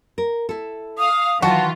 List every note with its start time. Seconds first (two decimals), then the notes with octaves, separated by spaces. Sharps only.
0.18 A#4
0.49 E4 A4
0.98 F5 D#6
1.42 D#3 E3 F#3 F4 F#4 A5